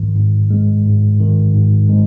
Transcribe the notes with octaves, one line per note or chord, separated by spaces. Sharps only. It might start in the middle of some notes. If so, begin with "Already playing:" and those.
Already playing: G#2 D#3
G#2
G#3
G#2
D#3
G#2
G#3